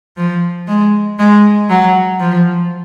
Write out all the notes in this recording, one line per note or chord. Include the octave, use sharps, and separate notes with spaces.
F3
G#3
G#3
F#3
F3